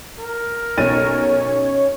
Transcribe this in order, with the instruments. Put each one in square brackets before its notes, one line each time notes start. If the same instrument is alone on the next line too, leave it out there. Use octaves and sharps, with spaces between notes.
[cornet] A#4
[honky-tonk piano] B1 A6 D#7 [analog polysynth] C#4 C#5